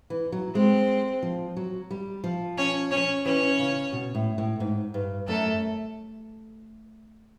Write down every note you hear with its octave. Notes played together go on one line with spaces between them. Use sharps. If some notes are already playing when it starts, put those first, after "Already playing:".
E3
F#3
G#3 C4 C5
F3
F#3
G3
F3
C#4 C#5
C#4 C#5
E3 C#4 C#5
C#3
B2
A2
A2
G#2
G2
F#2 A3 A4